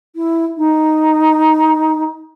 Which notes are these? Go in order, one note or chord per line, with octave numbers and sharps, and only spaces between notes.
E4
D#4